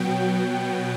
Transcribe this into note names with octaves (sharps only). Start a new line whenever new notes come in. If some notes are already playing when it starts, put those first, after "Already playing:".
Already playing: B2 F#3 B3 G5